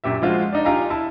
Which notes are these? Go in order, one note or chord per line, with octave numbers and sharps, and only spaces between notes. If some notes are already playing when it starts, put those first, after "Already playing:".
F#2 A#2 G4 E5
F3 G#3 F4 F#4
D4 D#4
D#4 F4 G4 F5 G#5 A#5
E4 A5